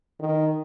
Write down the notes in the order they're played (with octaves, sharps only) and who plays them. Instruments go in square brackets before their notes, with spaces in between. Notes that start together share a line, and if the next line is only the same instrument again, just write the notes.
[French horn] D#3